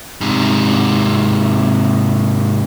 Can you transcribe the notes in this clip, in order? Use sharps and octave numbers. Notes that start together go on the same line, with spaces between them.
G#2 C3